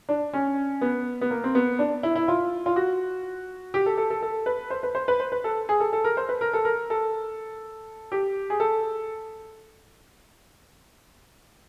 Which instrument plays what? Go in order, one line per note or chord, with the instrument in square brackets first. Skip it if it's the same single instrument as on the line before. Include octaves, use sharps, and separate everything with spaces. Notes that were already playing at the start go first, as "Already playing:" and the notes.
[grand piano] D4
C#4
B3
B3
A#3
C4
B3
D4
E4
E4
F4
F4
F#4
G4
A4
A4
A4
A4
B4
C5
B4
C5
B4
C5
B4
A4
G#4
A4
A4
A#4
C5
B4
A#4
A4
A#4
A4
G4
G#4
A4